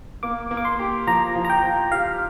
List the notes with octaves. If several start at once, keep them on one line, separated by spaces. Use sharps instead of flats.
A#3 D6
A#3
D6
C6
G4
F3 A#5
F3
A#5
G5
F3
G4 F5